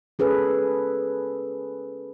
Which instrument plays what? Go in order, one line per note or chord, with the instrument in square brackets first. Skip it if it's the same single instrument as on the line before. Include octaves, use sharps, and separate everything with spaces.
[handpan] C#4 G#4 A4 B4